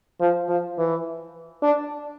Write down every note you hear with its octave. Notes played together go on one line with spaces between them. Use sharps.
F3
F3
E3
D4